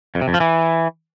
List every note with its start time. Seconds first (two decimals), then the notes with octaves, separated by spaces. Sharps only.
0.15 F2
0.21 C3
0.28 F2
0.34 F3
0.40 E3